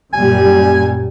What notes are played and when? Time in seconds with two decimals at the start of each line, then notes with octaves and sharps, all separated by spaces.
0.13 F#2 A#2 G3 G#5